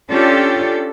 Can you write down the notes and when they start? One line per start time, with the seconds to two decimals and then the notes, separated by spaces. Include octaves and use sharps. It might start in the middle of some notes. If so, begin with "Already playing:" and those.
0.11 C#4 D4 F4 G4 A4